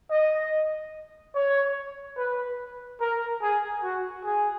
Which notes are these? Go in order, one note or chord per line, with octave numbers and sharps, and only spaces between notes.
D#5
C#5
B4
A#4
G#4
F#4
G#4